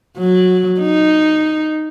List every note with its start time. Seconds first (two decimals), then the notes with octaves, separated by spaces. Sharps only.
0.18 F#3
0.80 D#4